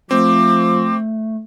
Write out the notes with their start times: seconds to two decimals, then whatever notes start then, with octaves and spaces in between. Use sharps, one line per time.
0.11 F3 A3 C4 D6